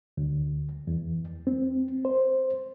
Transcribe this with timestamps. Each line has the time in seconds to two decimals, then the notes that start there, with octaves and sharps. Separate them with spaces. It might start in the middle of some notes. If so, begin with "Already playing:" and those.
0.17 D2
0.87 E2
1.47 C4
2.05 C5